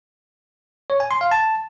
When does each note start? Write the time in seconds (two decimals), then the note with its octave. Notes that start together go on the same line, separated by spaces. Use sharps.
0.90 C#5
1.00 G#5
1.11 C6
1.21 F5
1.31 A5